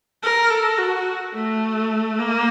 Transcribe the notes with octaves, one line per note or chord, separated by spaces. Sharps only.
A#4
A4
F#4
A3
A#3